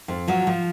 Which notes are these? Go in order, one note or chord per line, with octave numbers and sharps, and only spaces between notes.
F2
F3 F#3
F3